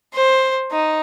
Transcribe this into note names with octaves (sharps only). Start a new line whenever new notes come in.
C5
D#4